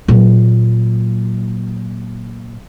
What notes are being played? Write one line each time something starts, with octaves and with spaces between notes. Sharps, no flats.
A#2 F#3